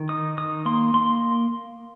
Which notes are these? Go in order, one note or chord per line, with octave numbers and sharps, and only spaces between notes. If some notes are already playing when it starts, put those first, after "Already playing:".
Already playing: D#3
D#4 D#6
D#3 D#6
A#3 C6
A#3 C6